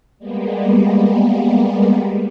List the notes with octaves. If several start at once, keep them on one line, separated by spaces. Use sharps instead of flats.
G3 G#3 A#3 B3